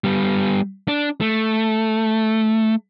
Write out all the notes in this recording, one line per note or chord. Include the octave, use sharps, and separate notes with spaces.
G3 B3
D4
A3